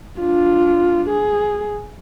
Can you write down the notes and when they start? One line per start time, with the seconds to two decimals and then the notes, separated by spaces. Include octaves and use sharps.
0.20 D4 F4
1.09 G#4